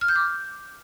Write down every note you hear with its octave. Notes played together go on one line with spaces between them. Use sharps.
F6
G6
D6